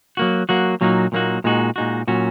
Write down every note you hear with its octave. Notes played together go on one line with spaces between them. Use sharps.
F#3 A#3 F#4
F#3 A#3 F#4
A#2 F#3 A#3 D#4 F#4
A#2 F#3 A#3 D#4 F#4
A#2 G#3 D#4 F#4
A#2 G#3 D#4 F#4
A#2 F#3 C#4 F#4